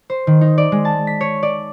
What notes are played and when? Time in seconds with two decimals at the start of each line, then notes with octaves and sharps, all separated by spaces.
0.10 C5
0.27 D#3
0.41 D#4
0.58 D5
0.72 G#3
0.85 A5
1.07 B6
1.21 C#5
1.43 D5